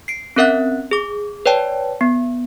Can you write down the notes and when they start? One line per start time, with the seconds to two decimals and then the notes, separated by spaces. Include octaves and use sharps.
0.08 C7 D7
0.36 C4 C#4 A#4 E5 F#5 F#6
0.91 G#4 D6
1.46 B4 C#5 D5 G5 A5
2.01 B3